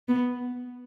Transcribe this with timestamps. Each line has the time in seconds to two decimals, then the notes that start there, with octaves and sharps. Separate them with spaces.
0.08 B3